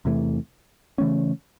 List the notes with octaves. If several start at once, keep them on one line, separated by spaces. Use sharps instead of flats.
E2 C3 E3 A3
C#3 E3 A3 C#4